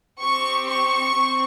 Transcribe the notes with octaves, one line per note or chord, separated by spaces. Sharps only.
C4 G4 C#6
C#6
C4